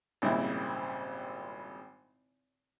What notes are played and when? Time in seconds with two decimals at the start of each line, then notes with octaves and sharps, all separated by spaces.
0.22 G#1 A#2 C#3 G3 C4 E4